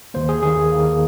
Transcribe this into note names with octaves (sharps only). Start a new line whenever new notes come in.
D#2 D#3 A#3 C5
G#4
D#2 D#3 A#3 G#4
D#2 D#3 A#3